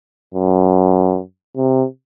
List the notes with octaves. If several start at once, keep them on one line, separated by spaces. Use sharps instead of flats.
F#2
C3